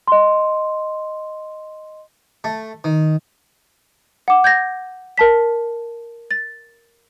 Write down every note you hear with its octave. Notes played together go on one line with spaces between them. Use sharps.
D#5 C6
A3
D#3
F#5 D6
G6 G#6 A#6
A#4 A5 B6
A6